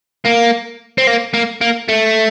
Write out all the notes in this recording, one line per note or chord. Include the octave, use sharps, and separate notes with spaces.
A#3
C4
A#3
A#3
A#3
A3